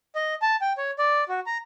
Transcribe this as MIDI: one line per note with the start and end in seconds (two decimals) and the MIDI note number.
0.15 0.34 75
0.42 0.56 81
0.61 0.73 79
0.78 0.91 73
0.99 1.24 74
1.29 1.40 66
1.46 1.58 82